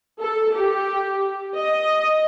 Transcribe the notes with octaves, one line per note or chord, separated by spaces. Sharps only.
A4
G4
D#5